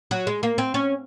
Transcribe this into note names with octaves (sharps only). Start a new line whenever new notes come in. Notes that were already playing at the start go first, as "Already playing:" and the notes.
F#3
G#3
A#3
C4
C#4